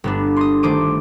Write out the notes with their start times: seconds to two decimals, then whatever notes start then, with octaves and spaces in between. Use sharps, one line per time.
0.04 G1 B3 D4
0.37 C6 D#6
0.63 D#3 A3 C5 D6 D#7